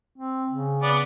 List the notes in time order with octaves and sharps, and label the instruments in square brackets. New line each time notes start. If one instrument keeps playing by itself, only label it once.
[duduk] C4
C#3
[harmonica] B3 D5